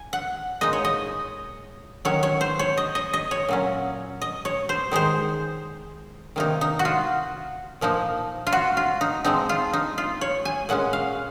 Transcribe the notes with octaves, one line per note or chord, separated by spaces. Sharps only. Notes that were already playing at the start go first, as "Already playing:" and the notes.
Already playing: G#5
F#5
A#2 G#3 D#4 D#5
C#5
D#5
D#3 F#3 C#4 C#5
C#5
C5
C#5
D#5
D#5
D#5
C#5
A#2 F#3 C#4
D#5
C#5
C5
D#3 G#3 D#4 C5
C3 D#3 A#3 D#4
D#4
F#4
F4
A#2 F3 A#3 D#4
F4
F#4
F4
D#4
F3 G#3 C4 D#4
F4
D#4
F4
C#5
G#5
A#2 G#3 C#4 F#5
F5